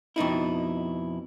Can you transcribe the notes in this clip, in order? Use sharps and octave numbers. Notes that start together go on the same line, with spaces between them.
F2 B2 D#4 E4